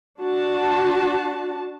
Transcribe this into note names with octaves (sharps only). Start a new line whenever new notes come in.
D4 F#4 A5